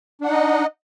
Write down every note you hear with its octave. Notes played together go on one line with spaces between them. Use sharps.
D4 D#4 D#5 F#5